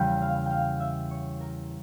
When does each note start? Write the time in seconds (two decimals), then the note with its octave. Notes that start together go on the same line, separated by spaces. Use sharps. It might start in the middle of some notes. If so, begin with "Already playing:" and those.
Already playing: E2 C#3 G3 A#3 G5
0.21 F5
0.46 F5 G5
0.80 E5
1.10 C#5
1.40 A#4